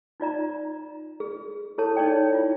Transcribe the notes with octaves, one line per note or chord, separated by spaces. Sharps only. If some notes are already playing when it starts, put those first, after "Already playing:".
D#4 F4 D5 A#5
G#4
E4 G#4 A4 C#5 A5
D#4 C#5 D5 G5
E4 F4